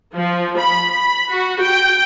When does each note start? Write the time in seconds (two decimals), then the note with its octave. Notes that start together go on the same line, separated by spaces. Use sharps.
0.14 F3
0.59 B5
0.90 B5
1.30 F#4
1.61 G5